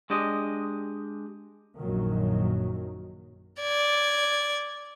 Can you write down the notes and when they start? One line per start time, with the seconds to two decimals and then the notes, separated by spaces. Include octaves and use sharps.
0.10 G#3 D4 G4 D#5
1.80 A#1 F#2 D#3 F#3
3.62 D5 G#6